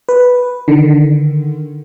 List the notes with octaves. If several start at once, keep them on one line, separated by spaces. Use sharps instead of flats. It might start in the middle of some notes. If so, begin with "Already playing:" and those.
B4
D3 D#3